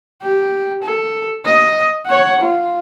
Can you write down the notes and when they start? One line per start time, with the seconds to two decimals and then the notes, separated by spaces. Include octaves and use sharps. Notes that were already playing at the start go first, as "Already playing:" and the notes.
0.22 G4
0.83 A4
1.45 D#5
2.06 C#5 F#5
2.41 F4